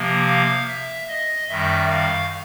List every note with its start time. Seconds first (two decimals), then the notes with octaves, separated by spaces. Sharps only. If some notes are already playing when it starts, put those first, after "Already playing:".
Already playing: C3 F3 A#3
0.26 F5
0.67 E5
1.08 D#5
1.49 F#2 D#3 G3 E5
1.90 F5